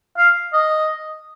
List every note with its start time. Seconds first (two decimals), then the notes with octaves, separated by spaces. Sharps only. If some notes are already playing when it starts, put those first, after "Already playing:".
0.17 F5
0.53 D#5